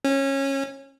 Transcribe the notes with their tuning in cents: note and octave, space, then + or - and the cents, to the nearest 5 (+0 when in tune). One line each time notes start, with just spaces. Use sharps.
C#4 -20